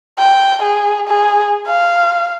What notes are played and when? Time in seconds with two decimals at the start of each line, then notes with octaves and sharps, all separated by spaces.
0.19 G5
0.63 G#4
1.08 G#4
1.67 F5